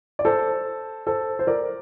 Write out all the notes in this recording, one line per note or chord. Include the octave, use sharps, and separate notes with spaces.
D5
A4 C5
A4 C5
C5
A#4 D5